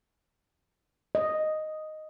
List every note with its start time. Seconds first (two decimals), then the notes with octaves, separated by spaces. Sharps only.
1.15 D#5